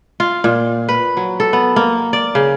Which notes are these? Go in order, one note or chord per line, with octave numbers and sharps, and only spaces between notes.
F4
A#2
B4
F#3
A4
B3
A#3
D5
C#3